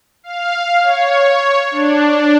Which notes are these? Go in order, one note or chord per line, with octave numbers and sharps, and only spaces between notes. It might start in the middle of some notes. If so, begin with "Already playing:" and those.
F5
C#5
D4